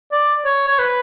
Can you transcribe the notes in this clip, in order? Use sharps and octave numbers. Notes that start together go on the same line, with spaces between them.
D5
C#5
C#5
B4